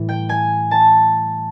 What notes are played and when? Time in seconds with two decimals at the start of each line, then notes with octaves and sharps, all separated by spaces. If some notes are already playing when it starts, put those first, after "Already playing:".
Already playing: A2 E3 G3
0.09 G5
0.29 G#5
0.71 A5